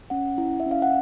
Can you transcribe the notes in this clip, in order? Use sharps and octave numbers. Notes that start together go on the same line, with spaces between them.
C#4 F#5
E4
E5
C#4
F5
F#5